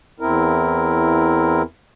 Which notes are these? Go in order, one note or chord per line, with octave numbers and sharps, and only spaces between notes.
E2 C4 E4 A#4